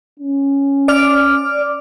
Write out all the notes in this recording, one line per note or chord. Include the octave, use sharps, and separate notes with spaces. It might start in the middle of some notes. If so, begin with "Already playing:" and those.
C#4
D5 D6 F6